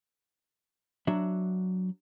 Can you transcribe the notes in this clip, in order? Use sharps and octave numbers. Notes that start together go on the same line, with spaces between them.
F#3 D4 F#4 E5